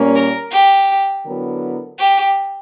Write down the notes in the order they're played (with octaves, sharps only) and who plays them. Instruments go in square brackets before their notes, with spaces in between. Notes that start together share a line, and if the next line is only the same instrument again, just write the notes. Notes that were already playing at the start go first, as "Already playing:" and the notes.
Already playing: [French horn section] A#2 G3 A#3 C#4
[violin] A#4
G4
[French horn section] D3 F#3 B3 E4 A#4
[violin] G4